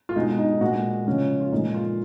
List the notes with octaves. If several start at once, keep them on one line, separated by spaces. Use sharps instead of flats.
F4
B2 G#3 D#4
D#4
A#2 G#3 F#4
C#3 F3 G#3 C#4
F4
A#2 F3 G#3 D#4
F4